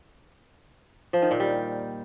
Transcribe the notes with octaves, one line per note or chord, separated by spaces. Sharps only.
F3
D#3
A#2
G3